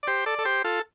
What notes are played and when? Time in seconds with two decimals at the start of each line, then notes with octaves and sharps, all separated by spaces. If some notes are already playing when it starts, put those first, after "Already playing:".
0.03 D5
0.07 G4 C5
0.26 A4 D5
0.39 A4
0.45 G4 C5
0.64 F4 A4